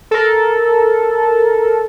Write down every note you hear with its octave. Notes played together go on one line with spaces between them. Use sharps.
A4 A#4